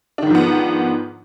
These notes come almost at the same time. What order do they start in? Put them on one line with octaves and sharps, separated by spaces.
D4 D#3 G#2 F3 B3